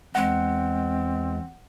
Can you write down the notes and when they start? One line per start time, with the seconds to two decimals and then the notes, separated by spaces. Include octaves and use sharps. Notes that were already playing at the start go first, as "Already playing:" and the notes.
0.15 E2 G#3 C4 F#5